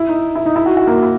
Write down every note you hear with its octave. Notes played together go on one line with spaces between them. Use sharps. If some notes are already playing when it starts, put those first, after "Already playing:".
Already playing: E4
D#4
E4
D#4
E4
F#4
F#4
A#3
E4